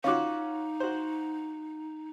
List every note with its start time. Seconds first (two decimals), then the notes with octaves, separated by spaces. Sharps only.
0.04 C#4 D#4 F4 F#4 F5 D6
0.80 F#4 C5